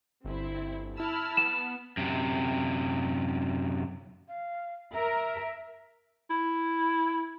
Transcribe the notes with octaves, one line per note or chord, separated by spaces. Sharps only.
G1 C4 E4
E4 A5 B5 E6 F6
B3 E7
F#2 C3
F5
A#4 E5
E4